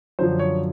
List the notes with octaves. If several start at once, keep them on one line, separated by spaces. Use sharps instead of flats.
F#2 D3 F3 C5
C#5